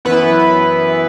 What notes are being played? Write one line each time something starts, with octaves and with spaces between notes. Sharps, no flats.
F#2 E3 B3 E4 B4